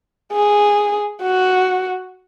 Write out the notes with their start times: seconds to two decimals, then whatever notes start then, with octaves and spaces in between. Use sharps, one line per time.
0.33 G#4
1.23 F#4